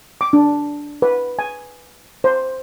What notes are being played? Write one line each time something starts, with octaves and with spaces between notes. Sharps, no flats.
D6
D4
B4
G#5
C5